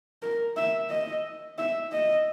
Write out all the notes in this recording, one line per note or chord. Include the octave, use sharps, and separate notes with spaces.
A#4
E5
D#5
E5
D#5